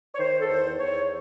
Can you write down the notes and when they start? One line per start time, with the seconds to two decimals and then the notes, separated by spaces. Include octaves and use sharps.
0.15 C#5
0.19 D#3 C5
0.40 A4
0.48 E2 C5
0.79 E2 C#5